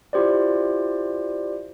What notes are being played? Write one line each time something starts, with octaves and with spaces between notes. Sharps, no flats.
E4 F4 G4 C5 D5